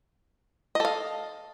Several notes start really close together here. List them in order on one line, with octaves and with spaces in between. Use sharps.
D#5 A4 F5